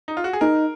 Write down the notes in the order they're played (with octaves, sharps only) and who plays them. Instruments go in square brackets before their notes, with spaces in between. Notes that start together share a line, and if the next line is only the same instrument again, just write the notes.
[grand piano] D#4
F4
F#4
G#4
[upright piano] D#4 [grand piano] A#4